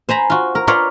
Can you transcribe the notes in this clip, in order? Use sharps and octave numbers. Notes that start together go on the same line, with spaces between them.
C5 G#5 A#5 B5
F4 F#4
A#4
F4 A#4 B4 C#5 D5 F5